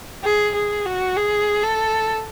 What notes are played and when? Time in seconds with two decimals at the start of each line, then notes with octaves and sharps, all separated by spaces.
0.24 G#4
0.55 G#4
0.85 F#4
1.16 G#4
1.63 A4